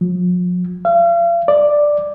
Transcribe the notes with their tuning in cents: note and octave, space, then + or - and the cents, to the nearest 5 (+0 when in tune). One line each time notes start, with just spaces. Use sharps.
F3 +45
F5 -40
D5 +5